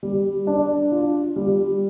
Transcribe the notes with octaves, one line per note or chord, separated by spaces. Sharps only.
G3
D4
F4
G3